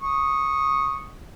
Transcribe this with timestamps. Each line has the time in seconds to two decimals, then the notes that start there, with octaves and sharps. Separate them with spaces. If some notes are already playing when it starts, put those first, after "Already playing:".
0.02 C#6 D#6